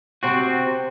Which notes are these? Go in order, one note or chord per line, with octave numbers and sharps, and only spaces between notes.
C3 C4 F#4